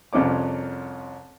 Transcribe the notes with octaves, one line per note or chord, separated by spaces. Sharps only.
C2 F2 C#4 C#5 D6